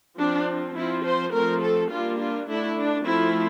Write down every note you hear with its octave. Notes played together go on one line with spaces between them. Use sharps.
F3 C4 D4
F3 C4 E4
C5
F3 A3 C4 A#4
A4
G3 A#3 D4 F4
F4
D3 A3 D4 E4
D4
F3 A3 C4 E4